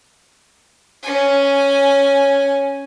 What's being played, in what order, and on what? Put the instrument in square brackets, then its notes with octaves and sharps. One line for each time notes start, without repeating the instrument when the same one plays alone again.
[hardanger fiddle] C#4 G#5